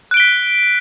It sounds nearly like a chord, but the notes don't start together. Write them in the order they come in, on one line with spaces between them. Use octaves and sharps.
F#6 D7 G7 B6